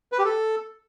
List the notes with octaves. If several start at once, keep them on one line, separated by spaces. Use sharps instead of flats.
B4
G4
A4